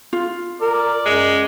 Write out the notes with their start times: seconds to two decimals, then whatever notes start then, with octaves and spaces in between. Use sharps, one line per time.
0.13 F4
0.61 A#4 D5
1.06 F#2 G#3